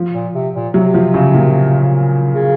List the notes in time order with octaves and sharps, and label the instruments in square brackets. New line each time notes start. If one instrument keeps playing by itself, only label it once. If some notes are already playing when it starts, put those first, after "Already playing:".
Already playing: [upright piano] F3
[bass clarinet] A#2
C3
A#2
[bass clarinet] C3 [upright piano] F#3
[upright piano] F3
C#3
A#2
[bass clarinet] C#3